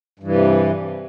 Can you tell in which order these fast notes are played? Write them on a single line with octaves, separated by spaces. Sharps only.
G2 E3 C3